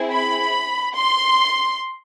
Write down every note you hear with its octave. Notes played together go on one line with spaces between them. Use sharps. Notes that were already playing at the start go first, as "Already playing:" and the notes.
Already playing: C4 E4 G#4
B5
C6